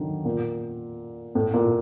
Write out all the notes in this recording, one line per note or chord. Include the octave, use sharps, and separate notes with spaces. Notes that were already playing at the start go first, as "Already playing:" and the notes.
Already playing: D3 D#3 F#3
A#2
A2
A#2